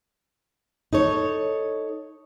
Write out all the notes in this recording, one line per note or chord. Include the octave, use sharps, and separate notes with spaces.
D#4 A4 C#5